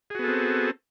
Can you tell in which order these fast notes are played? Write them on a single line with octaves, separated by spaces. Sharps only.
G#4 F#4 B3 A4 C4